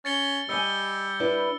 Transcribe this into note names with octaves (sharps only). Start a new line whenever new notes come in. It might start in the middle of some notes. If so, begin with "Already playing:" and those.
C#4 A6 C#7 G7
G3 D#5 F5 G#5 E6 C#7 G7
D4 E4 B4